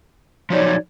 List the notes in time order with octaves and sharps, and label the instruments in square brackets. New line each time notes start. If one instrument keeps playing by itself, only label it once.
[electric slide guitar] F3 F#3 D#4 [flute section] C#5 D5